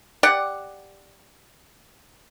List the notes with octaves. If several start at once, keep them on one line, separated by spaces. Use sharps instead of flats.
G4 D5 F#5